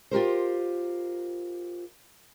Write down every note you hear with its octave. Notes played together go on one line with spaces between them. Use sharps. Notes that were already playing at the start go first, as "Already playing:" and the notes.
F4 G4 A#4 C5